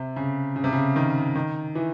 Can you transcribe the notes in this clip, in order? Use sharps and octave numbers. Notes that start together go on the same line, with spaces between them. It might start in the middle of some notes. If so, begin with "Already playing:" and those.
Already playing: C3
C#3
C#3
C3
C#3
D#3
D#3
E3